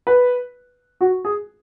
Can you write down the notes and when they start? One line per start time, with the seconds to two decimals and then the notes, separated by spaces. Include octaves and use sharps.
0.07 B4
1.01 F#4
1.25 G#4